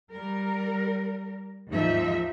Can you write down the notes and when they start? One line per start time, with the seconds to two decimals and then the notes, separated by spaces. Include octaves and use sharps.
0.12 G3 A#4
1.69 D#2 G#2 F3 D#4 E5